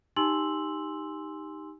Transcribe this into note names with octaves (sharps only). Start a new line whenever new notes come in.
D#4 G4 G#5 C6 E6 F#7